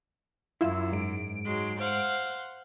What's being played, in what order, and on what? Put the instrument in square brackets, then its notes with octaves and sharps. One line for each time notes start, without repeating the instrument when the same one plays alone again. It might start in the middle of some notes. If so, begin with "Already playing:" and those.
[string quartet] F#2 [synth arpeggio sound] E4 F4 E6
[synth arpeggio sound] G#2 D7
[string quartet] F#3 G#3 C6
C5 F5 F#5